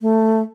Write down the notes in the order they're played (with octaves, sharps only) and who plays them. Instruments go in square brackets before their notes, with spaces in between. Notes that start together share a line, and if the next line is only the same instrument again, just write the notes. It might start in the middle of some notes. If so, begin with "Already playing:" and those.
[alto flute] A3